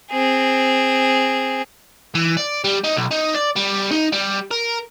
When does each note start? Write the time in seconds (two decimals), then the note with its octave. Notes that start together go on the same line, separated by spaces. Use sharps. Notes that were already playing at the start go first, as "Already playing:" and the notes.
0.12 C4 G#4
2.15 E3
2.37 D5
2.64 G3
2.84 D#4
2.96 B1
3.11 D#4
3.35 D5
3.56 G3
3.92 D#4
4.12 G3
4.51 A#4